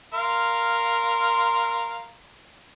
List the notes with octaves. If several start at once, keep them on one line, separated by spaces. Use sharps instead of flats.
A#4 F5 C6